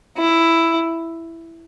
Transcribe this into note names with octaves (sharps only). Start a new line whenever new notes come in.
E4